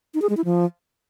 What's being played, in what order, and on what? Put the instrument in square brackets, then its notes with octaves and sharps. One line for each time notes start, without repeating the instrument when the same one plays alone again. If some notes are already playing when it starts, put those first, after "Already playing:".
[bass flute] D#4
G#4
G#3
E4
F3